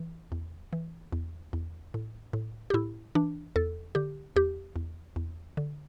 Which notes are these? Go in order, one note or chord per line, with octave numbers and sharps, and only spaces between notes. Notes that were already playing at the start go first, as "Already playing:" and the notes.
Already playing: E3
E2
E3
E2
E2
A2
A2
G4
A2 E4
E3 D4
E2 A4
D3 G4
E2 G4
E2
E2
D3